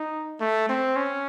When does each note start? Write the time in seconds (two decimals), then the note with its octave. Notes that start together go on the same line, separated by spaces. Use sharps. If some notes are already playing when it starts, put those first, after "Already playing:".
Already playing: D#4
0.40 A3
0.69 C4
0.96 C#4